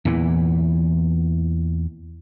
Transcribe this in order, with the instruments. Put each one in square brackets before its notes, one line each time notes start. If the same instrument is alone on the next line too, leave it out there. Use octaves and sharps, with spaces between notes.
[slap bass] E2 A#2 E3